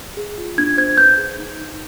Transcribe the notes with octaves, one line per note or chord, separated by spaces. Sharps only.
G#4
F4
D4 G#6
C5 G#6
B4 G6
G#4
D#4
D#4